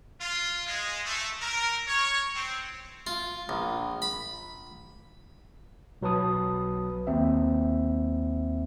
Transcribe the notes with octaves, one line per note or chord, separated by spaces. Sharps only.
F4
G#3
A3
A#4
C#5
C4
F4
A#1
B5
B1 F#3 B4 A5 D#6
D#2 C4 E5